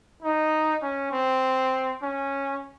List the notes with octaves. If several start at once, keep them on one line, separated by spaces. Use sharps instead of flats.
D#4
C#4
C4
C#4